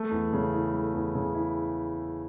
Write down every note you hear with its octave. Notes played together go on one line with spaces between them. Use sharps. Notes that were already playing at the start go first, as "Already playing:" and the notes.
Already playing: A3
E2
C#3
E4
A3
E2
C#3
E4